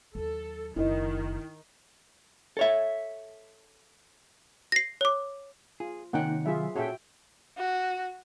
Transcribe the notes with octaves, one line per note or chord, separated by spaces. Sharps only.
D#2 F#3 A4
F#1 D#3 E4 D#5
A4 C#5 E5
A#6 C7
C#5 D6
F4 G#4
C3 D#3 A#3 C#4 D#4 F#5 G5
F#3 F4 G#4 E5
A#2 C#4 F#4 G#4 A4 E5 G5
F#4